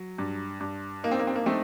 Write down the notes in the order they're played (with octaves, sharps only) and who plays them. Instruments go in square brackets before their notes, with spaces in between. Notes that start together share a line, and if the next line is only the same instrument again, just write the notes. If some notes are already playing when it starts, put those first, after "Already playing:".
Already playing: [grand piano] F#3
G2
G2
[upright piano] A#3 [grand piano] D#4
[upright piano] C4
A#3
C4
A#3
[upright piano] A3 C4 [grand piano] D#4